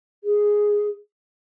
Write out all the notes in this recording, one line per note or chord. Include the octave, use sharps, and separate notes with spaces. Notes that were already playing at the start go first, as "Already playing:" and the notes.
G#4